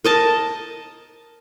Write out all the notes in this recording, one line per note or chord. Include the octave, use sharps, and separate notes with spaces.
A#4 D#5 A5